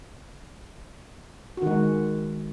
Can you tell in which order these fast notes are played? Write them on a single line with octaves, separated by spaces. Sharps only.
F#4 D#3 G#3